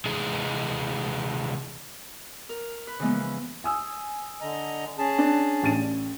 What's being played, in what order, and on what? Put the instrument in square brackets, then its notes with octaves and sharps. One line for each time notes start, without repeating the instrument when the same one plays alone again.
[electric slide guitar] C3 E3 G#3 D#4 G#4
[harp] A#4
B4
C#3 E3 F3 G#3 A#3 B3
B4
[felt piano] G#5 D#6 E6
[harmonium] D3 D#5 A#5
C#4 G#4 A5
[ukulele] D4
[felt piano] A1 A6 D#7